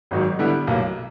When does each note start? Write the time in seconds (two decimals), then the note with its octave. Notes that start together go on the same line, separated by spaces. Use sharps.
0.11 G#1 G#2 D#3 F#3
0.39 D3 G3 B3 E4
0.67 B1 A2 F#3 A#3